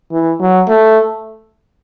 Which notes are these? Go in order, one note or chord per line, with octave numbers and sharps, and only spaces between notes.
E3
F#3
A3